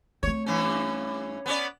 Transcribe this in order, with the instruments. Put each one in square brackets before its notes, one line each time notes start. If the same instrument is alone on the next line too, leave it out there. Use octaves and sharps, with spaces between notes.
[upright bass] A3 C4 [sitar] C#5
[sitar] G2 E3 C#4
B3 C#4 D5